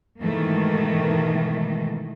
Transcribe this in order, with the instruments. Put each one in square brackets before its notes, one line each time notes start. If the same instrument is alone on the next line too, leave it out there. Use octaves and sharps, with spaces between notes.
[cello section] G#2 B2 D#3 E3 A3 A#3